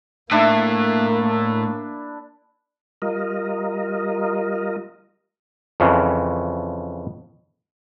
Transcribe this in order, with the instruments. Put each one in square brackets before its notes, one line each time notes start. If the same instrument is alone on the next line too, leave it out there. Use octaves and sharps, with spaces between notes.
[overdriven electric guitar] A2 [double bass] A#3 [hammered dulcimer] D4 E4
[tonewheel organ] G3 F4 A#4 D#5
[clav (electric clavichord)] F2 C#3 E3